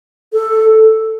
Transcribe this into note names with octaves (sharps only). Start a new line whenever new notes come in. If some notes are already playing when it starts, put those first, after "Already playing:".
A4